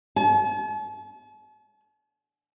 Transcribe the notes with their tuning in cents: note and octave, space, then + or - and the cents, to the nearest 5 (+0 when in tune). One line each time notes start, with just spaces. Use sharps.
A5 -45